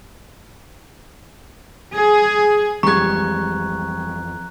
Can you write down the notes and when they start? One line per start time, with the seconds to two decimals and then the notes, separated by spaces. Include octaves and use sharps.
1.95 G#4
2.83 F2 E3 G3 G#3 A#5 C#6 F#6 G#6